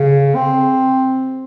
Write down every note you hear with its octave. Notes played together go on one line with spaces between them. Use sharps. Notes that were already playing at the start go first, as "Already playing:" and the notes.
Already playing: C#3
C4